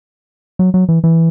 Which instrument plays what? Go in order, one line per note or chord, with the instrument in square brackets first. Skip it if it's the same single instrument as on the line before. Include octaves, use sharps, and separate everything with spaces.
[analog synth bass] F#3
F#3
E3
E3